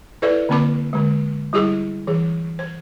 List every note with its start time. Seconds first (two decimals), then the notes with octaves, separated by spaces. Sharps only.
0.22 E4 A4 B4 C5 D5 E5
0.49 D3 A#3 C4 B5 D6
0.93 D3 G#3
1.53 G3 E4 G4 G#4 D6
2.07 E3 G#4
2.59 C5